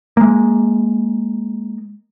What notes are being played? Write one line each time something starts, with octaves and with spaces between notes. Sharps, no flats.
G#3 A#3